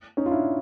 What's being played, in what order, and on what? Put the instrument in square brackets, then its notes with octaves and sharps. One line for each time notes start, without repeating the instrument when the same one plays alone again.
[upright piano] C#4 D#4
F4
D4 E4